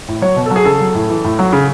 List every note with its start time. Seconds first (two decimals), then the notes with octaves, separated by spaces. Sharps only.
0.08 A2
0.22 F#3 C#5
0.36 B2
0.46 F#3 A4
0.56 G#4
0.65 C#3 A4
0.80 F#3
0.95 A2
1.10 E3
1.24 A2
1.39 F#3
1.53 C#3